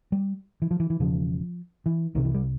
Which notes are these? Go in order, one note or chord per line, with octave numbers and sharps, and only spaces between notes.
G3
E3
F3
E3
E3
E1 E2 C#3 F3
E3
C2 C3 D#3
E3
G3